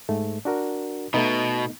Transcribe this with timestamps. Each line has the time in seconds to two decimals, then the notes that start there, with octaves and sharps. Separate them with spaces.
0.09 G#2 A3
0.45 D4 F#4 A#4
1.14 B2 A3 B3 D#4